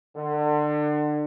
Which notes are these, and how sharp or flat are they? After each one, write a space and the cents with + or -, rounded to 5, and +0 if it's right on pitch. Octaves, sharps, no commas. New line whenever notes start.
D3 +30